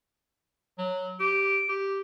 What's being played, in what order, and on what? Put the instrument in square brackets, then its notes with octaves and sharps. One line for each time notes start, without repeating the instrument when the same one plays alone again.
[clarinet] F#3
[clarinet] G4 [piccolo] D7
[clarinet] G4